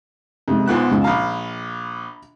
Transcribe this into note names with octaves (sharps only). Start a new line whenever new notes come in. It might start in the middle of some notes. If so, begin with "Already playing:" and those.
F2 C3 G#3
B1 G#2 B3 F4 F#6
C#2 C#3 G#3
A#1 F5 A#5 B5